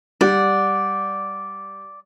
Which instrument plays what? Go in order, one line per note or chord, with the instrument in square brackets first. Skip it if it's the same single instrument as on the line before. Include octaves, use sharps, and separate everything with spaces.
[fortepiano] G3 [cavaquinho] D5 F#5